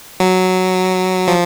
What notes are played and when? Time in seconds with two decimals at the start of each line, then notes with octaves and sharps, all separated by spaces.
0.20 F#3
1.28 F3